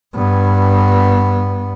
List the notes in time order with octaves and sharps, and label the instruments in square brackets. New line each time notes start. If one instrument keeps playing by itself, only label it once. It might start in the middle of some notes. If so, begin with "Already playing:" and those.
[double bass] G2 B3